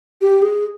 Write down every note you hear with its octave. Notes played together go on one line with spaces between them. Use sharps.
G4
G#4